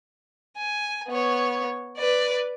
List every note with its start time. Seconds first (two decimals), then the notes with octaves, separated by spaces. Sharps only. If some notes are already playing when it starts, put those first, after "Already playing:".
0.58 G#5
1.08 B3 C#5
1.97 B4 D5